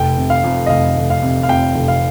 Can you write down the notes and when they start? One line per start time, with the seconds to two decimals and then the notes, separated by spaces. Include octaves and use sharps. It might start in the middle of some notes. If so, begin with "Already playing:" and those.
Already playing: F1 G5
0.17 C3
0.30 F5
0.44 F2
0.66 D#5
0.70 F1 F5
0.97 F1
1.10 F5
1.22 C3
1.43 F5
1.49 F2 G5
1.75 F1
1.88 F5